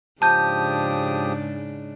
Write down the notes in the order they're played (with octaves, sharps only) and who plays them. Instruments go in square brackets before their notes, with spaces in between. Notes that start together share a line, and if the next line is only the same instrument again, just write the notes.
[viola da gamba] G#2 C#3 D4 [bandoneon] F3 G4 D#6 [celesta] A5 G6